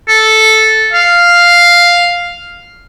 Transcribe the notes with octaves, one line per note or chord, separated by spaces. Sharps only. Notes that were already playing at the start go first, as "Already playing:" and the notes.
A4
F5